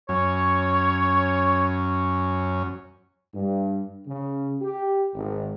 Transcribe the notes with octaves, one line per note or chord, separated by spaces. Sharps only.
F#2 C#4 C#5
G2
C#3
G4
G#1